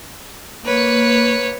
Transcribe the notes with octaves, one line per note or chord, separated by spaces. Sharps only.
A#3 B4 C#5